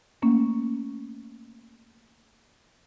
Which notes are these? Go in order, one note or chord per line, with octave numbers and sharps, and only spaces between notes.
A3 A#3 C#4